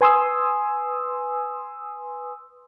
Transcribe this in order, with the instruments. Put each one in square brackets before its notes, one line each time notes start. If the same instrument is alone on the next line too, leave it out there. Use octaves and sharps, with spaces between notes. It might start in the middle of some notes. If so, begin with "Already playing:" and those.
[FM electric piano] B4 G#5 C6 D#6 E6